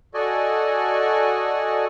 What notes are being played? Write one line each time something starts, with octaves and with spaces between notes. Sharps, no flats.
F#4 A4 D5 D#5 G#5